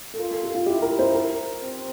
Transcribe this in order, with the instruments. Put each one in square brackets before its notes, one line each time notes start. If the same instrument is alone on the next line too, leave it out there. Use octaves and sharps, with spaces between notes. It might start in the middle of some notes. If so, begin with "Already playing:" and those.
[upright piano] A4
[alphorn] F4 [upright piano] A#4
[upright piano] A4
G4
F4
[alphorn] E4 [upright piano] G4
[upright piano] A#4
C5
A#4
[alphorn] C4